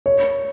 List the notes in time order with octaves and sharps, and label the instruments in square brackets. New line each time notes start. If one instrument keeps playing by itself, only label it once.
[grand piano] C#5